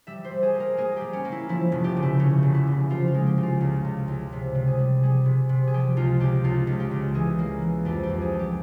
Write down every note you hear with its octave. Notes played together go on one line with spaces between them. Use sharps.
G3 E5
C5
G3
G#4
A#3
A#4
A#3 G#4
G3 G4
C#4
A#3
E4
F3 E4
F1
G4
C#3
E4
C#3 C#4
F1
E4
C#3
F3 F4
F4
G#3
G4
C#3
F4
C#2
C#2
C#2
C3
C3
G#4
G3
G3 G#4
C3
C3
G#4
F3 G4
C#2 F4
C#2 G4
C#2 F4
C#2
G4
C#2
E3 G#4
A#3
E3
F2 G4
G4
F2
G#4
G3
G4